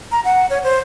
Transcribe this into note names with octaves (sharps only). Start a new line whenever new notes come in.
A#5
F#5
C#5
C5